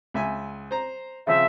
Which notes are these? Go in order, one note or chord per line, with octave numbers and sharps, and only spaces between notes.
C#2 E5 G#5
C5 A#5
C#3 F3 C4 E5